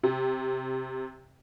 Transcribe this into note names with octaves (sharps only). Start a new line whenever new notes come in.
C3